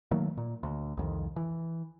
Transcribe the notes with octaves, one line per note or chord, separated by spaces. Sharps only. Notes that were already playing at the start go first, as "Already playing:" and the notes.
D#3 F#3 A3 A#3
A#2
D2
C2 F2 D#3
E3